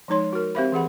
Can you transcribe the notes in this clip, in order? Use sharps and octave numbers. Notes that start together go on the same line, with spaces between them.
F3 G#3 D#4 C#5 C6
F#4 A#4
C4 G4 C5 E5 F5 B5
E3 G#4 F#5 B5